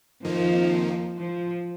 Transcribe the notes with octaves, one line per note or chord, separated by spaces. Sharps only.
F2 D#3 F3 A#3 D#4
F3